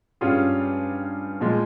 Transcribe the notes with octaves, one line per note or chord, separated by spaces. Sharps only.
G2 G3 C#4 F4 G#4
A#2 F3 G#3